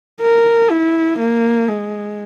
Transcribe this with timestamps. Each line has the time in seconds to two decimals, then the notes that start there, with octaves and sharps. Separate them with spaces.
0.21 A#4
0.70 E4
1.19 A#3
1.68 G#3